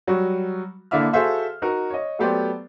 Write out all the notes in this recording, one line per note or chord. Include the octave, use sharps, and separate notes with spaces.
F#3 G3 F#4
D3 A#3 E4 D5 E5 F6
F#4 G#4 A4 C5 E5 F5
D#4 F#4 A#4
C#5 D#5
F#3 A3 B3 G4 C5 D5